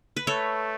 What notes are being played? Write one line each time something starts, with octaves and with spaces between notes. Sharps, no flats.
B4
A3 A4 C#5